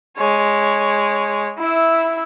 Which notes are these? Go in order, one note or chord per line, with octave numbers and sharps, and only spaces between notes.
G#3 C#5
E4 E5